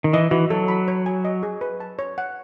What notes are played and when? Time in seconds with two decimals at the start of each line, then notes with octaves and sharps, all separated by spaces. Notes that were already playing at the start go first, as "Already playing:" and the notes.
0.04 D#3
0.13 E3 D#5
0.31 E3 F#4
0.50 F#3 A4
0.68 B5
0.88 C#5
1.06 G#5
1.25 D#5
1.43 G#4
1.61 B4
1.80 A5
1.99 C#5
2.18 F#5